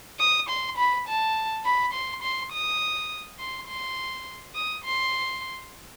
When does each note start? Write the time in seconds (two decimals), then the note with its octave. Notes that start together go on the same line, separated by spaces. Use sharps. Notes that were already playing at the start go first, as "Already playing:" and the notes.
0.19 D#6
0.49 C6
0.77 B5
1.07 A5
1.65 B5
1.93 C6
2.22 C6
2.52 D#6
3.39 C6
3.67 C6
4.55 D#6
4.84 C6